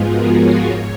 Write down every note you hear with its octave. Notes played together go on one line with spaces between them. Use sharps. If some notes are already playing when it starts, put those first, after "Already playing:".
Already playing: G#2 F3 G#3 B3 F4 G#4
F#4 A#4
C#5 F5
G#2 C#5